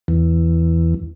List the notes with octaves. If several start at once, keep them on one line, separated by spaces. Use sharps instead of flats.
E2